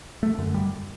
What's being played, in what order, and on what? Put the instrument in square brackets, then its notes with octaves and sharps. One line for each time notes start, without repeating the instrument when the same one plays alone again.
[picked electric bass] A3
F#2 D3
G3